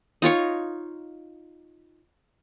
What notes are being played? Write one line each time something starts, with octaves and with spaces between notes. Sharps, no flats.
D#4 F4 C#5 C#6